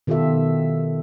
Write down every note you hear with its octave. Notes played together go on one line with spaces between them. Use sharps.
B2 D#3 F4 G4 A4 E5